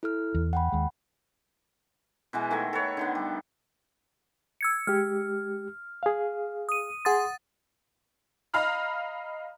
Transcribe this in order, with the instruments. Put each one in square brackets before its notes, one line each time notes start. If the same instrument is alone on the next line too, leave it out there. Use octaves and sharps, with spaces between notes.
[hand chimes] E4 A4 F6
[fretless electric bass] E2
[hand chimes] F#5 G5 B5
[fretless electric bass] D#2 G#3
[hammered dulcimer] B2 E3 G#3
D#3 A3 A4 G#5
A4 B4 C#5
D3 D#3 B3
G3
[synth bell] E6 G#6 C#7
[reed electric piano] G#3 G4 [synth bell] F6
[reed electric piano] G#4 F5
[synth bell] D#6 D#7
[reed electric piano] G#4 C6 [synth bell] F#5 D#6 A6
[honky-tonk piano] D#5 F5 A#5 B5 F6